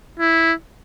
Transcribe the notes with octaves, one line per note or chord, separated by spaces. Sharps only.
E4